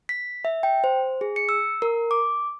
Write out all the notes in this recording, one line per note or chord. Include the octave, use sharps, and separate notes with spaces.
B6
E5
G5
C5
G#4
C#7
E6
A#4
D6